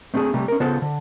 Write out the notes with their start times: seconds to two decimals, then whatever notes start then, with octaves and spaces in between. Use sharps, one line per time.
0.14 A3 C4 D4 F#4 G#4
0.34 C3 G3 A3
0.48 C#4 A#4
0.60 C#3 B3 F4 A4 C5 F5
0.82 D3